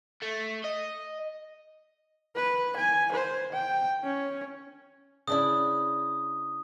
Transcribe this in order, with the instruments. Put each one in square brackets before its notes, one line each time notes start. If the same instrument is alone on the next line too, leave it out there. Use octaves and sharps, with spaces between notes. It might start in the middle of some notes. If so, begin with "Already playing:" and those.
[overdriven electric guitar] A3
D#5
[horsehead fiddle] B4
G#5
C5
G5
C#4
[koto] C#3 D4 E4 [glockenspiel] D#6